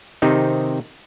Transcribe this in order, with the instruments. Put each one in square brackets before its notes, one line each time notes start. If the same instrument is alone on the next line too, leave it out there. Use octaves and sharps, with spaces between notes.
[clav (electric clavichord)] C3 D#3 C4 D#4